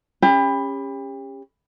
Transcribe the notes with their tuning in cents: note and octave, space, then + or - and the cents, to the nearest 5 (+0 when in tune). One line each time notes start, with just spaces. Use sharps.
C#4 -10 G4 +35 B5 +0